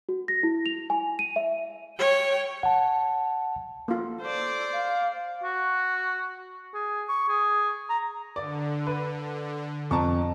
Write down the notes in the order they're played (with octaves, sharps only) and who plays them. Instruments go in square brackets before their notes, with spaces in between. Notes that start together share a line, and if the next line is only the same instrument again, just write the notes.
[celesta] F#4
A#6
E4
F7
G#5
D#7
E5
[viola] C#5 G5
[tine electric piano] F#5 A5
[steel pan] A#3 F4 [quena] A4
[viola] C5 D5
[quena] F5
[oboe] F#4
G#4
C#6
G#4
A#5
[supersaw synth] D3 [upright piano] D5
[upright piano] B4
[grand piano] F2 [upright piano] A5 A#5 C#6